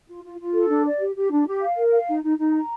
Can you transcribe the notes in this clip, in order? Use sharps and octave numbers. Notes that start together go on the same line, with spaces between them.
F4
F4
F4
A4
D4
D5
G4
G4
D4
G4
F5
A#4
F5
D#4
D#4
D#4
A#5